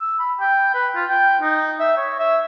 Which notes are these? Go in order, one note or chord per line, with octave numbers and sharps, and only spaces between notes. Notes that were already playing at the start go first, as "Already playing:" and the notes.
E6
B5
G5
B4
F4
G5
D#4
E5
C#5
E5